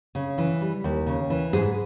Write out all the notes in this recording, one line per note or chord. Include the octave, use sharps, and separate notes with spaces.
C#3
E3
G3
D#2
C#3
E3
G#2 G#4